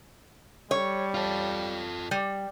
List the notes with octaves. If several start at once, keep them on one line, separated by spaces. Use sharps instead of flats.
G3 C#5
F4 A4
G3